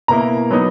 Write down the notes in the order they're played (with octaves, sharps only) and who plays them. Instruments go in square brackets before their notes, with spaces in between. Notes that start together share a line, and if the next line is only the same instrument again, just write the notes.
[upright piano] B2 A#3 E4 A#5
F#3 B3 D#4